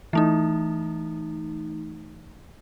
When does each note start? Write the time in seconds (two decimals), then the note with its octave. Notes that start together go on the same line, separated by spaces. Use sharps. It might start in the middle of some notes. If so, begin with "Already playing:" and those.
0.13 E3 A3 D#4